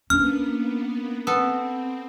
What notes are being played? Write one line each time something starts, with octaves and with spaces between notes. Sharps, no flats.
A#3 B3 C#4 D4 F6
B3 C4 A4